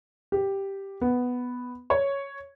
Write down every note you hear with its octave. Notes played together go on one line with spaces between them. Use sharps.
G4
B3
C#5